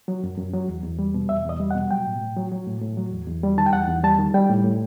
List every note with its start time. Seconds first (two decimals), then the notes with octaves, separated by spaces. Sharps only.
0.08 F#3
0.24 F#2
0.38 F#2
0.53 F#3
0.68 E2
0.83 E2
0.99 G3
1.14 B2
1.29 E2 E5
1.45 E2 D#5
1.60 G3
1.71 F#5
1.75 B2
1.91 F#3 G5
2.06 A2
2.21 A2
2.37 F#3
2.52 F#3
2.67 A2
2.82 A2
2.97 F#3
3.12 E2
3.27 E2
3.43 G3
3.58 D#3 A5
3.66 G5
3.73 E2 F#5
3.88 E2
4.04 G3 A5
4.19 D#3
4.34 G3 G5
4.50 A2
4.64 A2